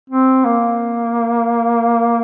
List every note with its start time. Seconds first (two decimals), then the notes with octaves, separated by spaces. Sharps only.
0.10 C4
0.45 A#3